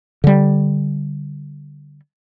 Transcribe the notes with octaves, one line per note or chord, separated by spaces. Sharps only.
D3 G3